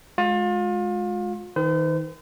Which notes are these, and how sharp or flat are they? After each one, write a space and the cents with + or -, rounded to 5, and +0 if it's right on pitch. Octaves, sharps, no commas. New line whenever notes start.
G#3 +15 F4 +35
D#3 +20 C5 -45